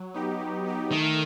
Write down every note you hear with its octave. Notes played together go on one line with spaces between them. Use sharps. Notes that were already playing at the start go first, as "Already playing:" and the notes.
Already playing: F#3
B3 D#4 G4
F#3
B3 D#4 G4
D#3 A3